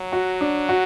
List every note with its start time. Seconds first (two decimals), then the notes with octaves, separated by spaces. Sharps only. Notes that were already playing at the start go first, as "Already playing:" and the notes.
Already playing: F#3
0.12 F#4
0.41 D4
0.69 F#4